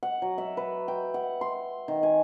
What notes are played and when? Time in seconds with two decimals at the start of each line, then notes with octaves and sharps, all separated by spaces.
0.03 F#5
0.22 F#3
0.38 E5
0.57 B4
0.88 G5
1.14 F#5
1.41 C6
1.88 D#3
2.03 G#5